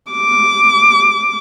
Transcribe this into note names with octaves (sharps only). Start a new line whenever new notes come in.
D6